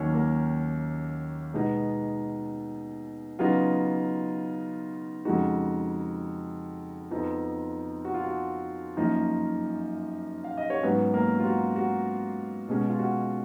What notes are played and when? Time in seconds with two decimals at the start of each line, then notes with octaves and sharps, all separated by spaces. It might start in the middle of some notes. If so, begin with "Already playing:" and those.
Already playing: D#2 D#3 F#3 A#3 C#4 C#5
0.14 A#3 A#4
1.54 B2 G#3 B3 D#4
3.39 C#3 F#3 B3 D#4 F4
5.25 F2 C#3 G#3 D#4 F#4
7.11 F2 F3 B3 D#4
8.05 F#4
8.14 F4
8.24 F#4
8.97 F#2 F3 A#3 D#4
10.44 F5
10.57 D#5
10.70 C#5
10.83 G#2 F#3 B3 C#4 B4
11.14 A#3 A#4
11.39 F4
11.45 F#4
11.76 F#4
12.69 B2 G#3 C#4
12.89 F4
12.99 F#4